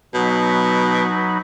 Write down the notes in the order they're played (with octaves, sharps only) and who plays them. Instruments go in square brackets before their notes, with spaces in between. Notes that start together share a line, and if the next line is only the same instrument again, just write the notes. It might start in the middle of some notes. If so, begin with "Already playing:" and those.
[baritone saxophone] B2 [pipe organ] F#3 D#4 B5